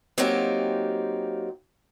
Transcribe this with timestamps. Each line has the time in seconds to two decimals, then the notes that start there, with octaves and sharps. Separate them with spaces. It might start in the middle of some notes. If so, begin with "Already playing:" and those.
0.18 F#3 A#3 C4 D#4 F4 G4